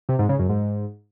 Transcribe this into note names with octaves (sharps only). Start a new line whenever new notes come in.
C3
G#2
C#3
F#2
G#2